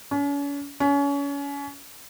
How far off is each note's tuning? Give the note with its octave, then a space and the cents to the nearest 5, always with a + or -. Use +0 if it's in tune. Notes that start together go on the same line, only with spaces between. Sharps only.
C#4 +40
C#4 +30